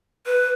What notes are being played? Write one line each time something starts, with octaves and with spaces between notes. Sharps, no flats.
B4